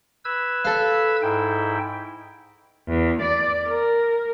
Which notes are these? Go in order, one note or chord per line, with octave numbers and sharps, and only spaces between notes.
B4 E6 G#6
A4 F5
G#2 E4 G5
E2
D5
A#4